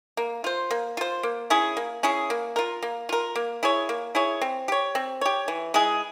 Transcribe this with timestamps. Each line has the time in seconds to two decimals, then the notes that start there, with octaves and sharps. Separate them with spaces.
0.17 A#3
0.44 F4 C5
0.71 A#3
0.97 F4 C5
1.23 A#3
1.50 C#4 E4 G#4
1.77 A#3
2.03 C#4 E4 G#4
2.30 A#3
2.56 F4 A#4
2.83 A#3
3.09 F4 A#4
3.35 A#3
3.63 E4 G#4 C#5
3.89 A#3
4.15 E4 G#4 C#5
4.41 C4
4.68 G4 C#5
4.95 C4
5.21 G4 C#5
5.48 E3
5.74 G#3 E4 G#4